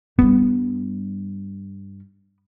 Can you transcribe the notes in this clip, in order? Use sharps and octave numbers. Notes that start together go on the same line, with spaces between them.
G2 G3 B3